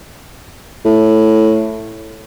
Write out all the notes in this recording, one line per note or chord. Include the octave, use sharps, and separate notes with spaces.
A2